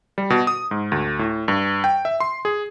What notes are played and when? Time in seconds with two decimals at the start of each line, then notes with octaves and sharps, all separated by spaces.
0.18 G3
0.30 B2
0.47 D#6
0.71 G#2
0.92 D2
1.19 A2
1.48 G2
1.84 G5
2.05 E5
2.20 C6
2.45 G#4